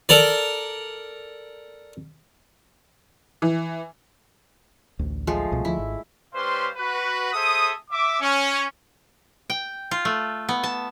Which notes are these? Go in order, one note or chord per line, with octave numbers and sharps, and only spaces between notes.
A4 A#4 D5
E3
A1 D2
F3 G#3 A3
C2 B2
D2 F3 E4
G#1
G3 C#4 B4 C5 F5 C6
F#4 B4
G#4 A4 C5 E5 D#6
E5 D6
C#4
G5
F4
A3
B3
A5